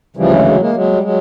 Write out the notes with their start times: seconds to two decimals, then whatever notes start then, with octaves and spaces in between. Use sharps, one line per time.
0.16 D2 C#3 E3 F3 G3
0.31 F#3 G#3
0.46 F#3 G#3
0.60 G#3 A#3
0.74 F#3 G#3
0.93 G3
1.03 F#3 G#3